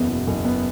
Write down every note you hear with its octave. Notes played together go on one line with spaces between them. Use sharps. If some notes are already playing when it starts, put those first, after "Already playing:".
Already playing: F#1 E2 B3
B2
F#1
B3